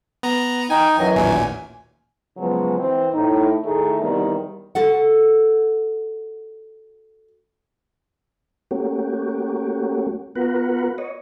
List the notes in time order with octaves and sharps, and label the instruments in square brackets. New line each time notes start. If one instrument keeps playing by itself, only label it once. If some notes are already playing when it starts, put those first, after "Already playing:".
[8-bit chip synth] B3 A#5
[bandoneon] D#4 [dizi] G5 [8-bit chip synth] G#5
[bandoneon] F#2 E3 F#3 [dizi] D#5
[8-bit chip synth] A1 D#2 A#2 [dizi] G#5
[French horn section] C#3 F3 F#3 G#3 B3
E3 C4
A2 D#4
A2 D#3 A3 D#4 G#4
E2 C3 D#3 G3
[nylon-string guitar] F#4 A4 F#5
[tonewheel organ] A3 A#3 C#4 F#4 G4
B3 F4 F#4 A#4 B4 F#5
C#5 D#5